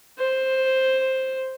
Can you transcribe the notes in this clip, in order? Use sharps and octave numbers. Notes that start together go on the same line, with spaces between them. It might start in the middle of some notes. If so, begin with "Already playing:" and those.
C5